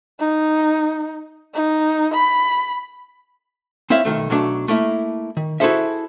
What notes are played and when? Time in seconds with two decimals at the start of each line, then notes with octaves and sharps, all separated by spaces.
0.20 D#4
1.54 D#4
2.14 B5
3.90 C4 E4 C#5 E5 F5
4.05 B1 E2 D#3 A3
4.30 B1 F#3 A3 D4
4.68 A3 A#3 E4
5.37 D#3
5.60 E4 F#4 G#4 A4 C5 E5